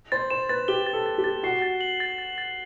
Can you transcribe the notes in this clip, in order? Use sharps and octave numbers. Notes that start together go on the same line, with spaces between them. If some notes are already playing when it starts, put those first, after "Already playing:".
C5 A6
C5 E7
B4 A6
G4 G7
A6
A4
A6
G4
A6
F#4 C7
A6
F#7
A6
A6
A6